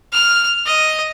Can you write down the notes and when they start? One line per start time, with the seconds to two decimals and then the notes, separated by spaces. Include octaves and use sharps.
0.12 F6
0.66 D#5